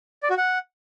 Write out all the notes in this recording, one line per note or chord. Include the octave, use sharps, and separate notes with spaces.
D5
F#4
F#5